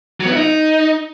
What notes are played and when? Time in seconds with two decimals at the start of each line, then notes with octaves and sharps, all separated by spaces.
0.20 F#3
0.26 B3
0.31 E4
0.36 D#4